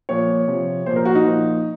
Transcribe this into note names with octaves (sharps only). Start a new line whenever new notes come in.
A#2 F3 C#5
C3 F3
A#2 F3 C5
A#4
F#4
D#4
A#2 F3